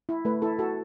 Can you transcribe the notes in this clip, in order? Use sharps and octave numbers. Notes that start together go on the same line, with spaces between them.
E4
A3 B4
E4 A4
F#4 A4